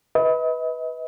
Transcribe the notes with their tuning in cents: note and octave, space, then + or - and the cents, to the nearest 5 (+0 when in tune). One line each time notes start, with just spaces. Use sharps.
B4 +0 D#5 +40